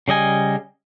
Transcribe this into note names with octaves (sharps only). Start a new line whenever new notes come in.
C#3 G3 D#5 G#5